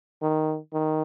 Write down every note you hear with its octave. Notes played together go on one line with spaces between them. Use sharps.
D#3
D#3